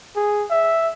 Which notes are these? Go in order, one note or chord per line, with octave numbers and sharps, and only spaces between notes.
G#4
E5